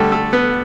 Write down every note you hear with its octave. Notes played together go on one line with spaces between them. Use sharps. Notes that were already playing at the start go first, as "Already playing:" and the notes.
Already playing: D3 G3 A3 A4
A3 A4
B3 B4